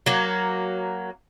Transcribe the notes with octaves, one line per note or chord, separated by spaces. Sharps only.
F#3 A#3